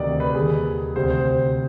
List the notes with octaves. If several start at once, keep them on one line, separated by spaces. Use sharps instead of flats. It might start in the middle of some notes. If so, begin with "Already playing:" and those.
Already playing: D2 C3 D#3 D5
B4
D#2 D#3 G3 G#4
D2 C3 G3 C5
C5